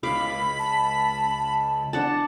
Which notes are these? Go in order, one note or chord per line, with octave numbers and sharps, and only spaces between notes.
C#2 F5 B5 D6
A5
D4 F#5 A5